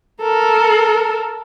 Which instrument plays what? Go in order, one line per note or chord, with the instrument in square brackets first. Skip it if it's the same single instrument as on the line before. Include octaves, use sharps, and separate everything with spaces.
[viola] A4 A#4